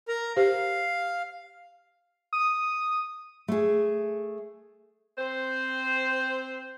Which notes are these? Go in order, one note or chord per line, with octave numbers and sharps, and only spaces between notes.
A#4 A#5
G4 C5 F5
D#6
A3 G#4
C4 C5